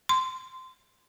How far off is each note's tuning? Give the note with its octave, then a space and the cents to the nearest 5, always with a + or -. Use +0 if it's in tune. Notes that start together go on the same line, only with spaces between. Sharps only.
C6 -15